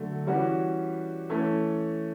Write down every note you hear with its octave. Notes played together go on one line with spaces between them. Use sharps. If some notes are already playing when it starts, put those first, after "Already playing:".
Already playing: D3 F#3 A3
E3 G3 C#4 F#4
E3 A3 C#4